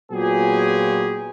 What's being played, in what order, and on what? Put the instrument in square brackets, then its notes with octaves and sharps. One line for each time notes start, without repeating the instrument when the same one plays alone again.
[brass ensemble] A#2 F#3 B3 F4 G4 G#4